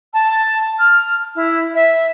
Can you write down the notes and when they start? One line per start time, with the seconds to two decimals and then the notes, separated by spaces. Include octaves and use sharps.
0.13 A5
0.79 F6
1.35 E4
1.74 E5